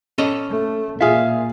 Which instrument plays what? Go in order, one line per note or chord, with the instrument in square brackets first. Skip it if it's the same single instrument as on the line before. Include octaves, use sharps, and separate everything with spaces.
[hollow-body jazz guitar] C#4 A4 D#5
[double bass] A3
[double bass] A#2 [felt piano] F4 G#4 [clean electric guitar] E5 F5